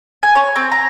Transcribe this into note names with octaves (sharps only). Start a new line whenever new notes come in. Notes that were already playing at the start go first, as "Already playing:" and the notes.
G#5
C#5
C4
A#5